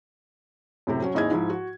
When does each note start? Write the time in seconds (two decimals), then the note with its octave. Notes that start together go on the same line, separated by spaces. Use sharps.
0.87 F#2 A2 C3
1.02 F#3 C#4
1.15 G#1 D#2 D#4 E4 G#4 G#6
1.31 G#2 F3 E4
1.50 F#4